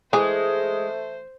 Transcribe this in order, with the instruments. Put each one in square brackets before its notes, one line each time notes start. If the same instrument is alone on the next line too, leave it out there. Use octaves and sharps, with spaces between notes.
[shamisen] E3 G#4 [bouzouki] G#3 [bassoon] A3 [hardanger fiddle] C5